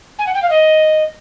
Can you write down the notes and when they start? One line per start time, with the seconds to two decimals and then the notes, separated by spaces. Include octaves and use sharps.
0.19 G#5
0.26 F#5
0.34 G5
0.42 F5
0.50 D#5